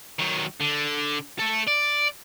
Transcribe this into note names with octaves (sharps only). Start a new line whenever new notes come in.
D#3 F#3
D3
A3 A4
D5